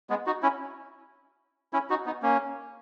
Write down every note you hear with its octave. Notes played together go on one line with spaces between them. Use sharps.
G#3 B3
D#4 F#4
C#4 E4
C#4 E4
D#4 F#4
B3 D#4
A#3 C#4